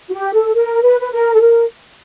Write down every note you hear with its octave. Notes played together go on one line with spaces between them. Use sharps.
F#4
G4
A4
A#4
B4
B4
A#4
A4
A#4